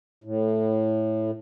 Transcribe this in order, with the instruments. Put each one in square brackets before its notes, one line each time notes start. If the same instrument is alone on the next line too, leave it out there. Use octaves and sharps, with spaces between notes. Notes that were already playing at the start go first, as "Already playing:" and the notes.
[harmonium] A2